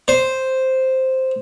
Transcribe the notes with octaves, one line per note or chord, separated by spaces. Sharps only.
C5